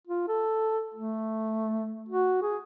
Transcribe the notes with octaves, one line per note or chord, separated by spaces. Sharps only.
F4
A4
A3
F#4
G#4